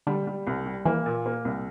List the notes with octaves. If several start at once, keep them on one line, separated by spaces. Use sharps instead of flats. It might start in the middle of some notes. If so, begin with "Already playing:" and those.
D3 G3
G3
C2
G3
E3 A#3
A#2
A#3
C2